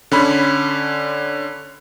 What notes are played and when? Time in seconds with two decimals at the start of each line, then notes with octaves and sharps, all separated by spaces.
0.12 D3 C#4 B5